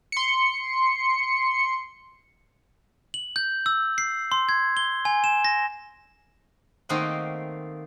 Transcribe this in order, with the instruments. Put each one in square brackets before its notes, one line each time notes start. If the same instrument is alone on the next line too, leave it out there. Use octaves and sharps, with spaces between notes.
[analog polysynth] C6 C#7
[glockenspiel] F#7
G6
E6
C7
C6
G#6
G7
G#5
E7
A#6
[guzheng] D#3 A3 A#3 C4 D#5 F#5